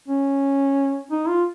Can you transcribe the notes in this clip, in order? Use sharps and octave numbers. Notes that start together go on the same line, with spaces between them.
C#4
D#4
F4